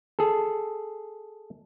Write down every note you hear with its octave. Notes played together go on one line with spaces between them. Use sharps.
G#4 A4